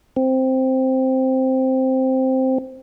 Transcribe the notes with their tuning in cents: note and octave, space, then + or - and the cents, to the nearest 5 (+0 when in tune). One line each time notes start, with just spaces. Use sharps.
C4 +0